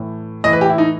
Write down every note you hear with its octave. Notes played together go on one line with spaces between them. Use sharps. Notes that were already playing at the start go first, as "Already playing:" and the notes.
Already playing: A2 E3
A2 E3 D#5
B4
G4
E4
D#4